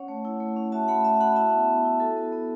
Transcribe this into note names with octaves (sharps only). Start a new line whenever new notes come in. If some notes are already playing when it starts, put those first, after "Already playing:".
Already playing: C#4 C#5 F#5
A3
E4
A3
C#4
F#4 E5 A5
A3 F#5 B5
A3 E5 A5
F#4 F#5 B5
E4 E5 A5
B3
B3
E4
F#4 A4
B3
B3